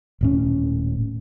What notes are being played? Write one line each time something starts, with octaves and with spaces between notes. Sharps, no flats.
D#1 A2 C#4